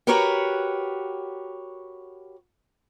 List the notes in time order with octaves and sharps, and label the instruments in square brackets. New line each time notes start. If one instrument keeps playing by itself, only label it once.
[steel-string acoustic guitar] F#4 G4 A#4 B4 C#5 F#5